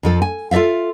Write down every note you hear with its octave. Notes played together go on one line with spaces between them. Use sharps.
F2 F3 A4
G#5
F4 A4 D5 E5 F5